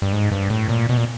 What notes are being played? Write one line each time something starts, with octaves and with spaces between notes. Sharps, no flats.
G2
G#2
G2
A2
A#2
B2
A#2